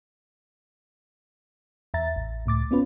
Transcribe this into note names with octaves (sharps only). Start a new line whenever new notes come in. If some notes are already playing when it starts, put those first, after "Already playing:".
E2 E5 A#5 A6
A1
C#2 A2 D6 A6
B3 C#4 F4 B4